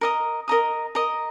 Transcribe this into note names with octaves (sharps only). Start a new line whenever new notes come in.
A#4 D#5 A#5 D#6
A#4 D#5 A#5 D#6
A#4 D#5 A#5 D#6